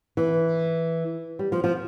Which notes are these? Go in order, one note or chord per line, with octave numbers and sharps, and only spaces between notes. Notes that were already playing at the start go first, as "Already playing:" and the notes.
E3
G3
F3
F3